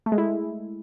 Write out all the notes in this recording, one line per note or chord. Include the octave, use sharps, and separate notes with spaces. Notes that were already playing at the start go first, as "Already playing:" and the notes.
A3
G#3
E4